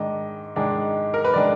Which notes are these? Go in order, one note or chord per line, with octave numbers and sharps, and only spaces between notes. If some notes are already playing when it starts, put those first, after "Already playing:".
Already playing: G#2 D#3 G#3 D4 D#5
G#2 D#3 G#3 D4
A#4
B4
D#3 G#3 D4 D5